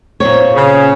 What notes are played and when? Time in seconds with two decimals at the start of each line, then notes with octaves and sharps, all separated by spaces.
0.20 A#2 C4 C#5
0.55 C#3